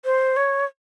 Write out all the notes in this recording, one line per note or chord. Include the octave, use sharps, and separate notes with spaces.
C5
C#5